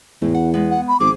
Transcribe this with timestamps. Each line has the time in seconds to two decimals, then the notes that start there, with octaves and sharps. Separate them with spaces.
0.22 E2 A2 A3
0.34 F#5
0.54 G#3 B3
0.71 F#5
0.88 B5
1.00 G#1 F3 G#4 D6